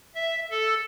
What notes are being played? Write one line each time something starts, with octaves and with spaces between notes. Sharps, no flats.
E5
A4